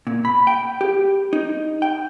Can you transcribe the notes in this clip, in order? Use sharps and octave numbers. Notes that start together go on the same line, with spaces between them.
A#2
B5
G5
G4
D#4
G5